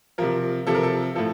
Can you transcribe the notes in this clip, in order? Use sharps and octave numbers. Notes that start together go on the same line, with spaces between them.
C3 F3 A#4
C3 F3 A4
A#4
A4
A2 F3 A4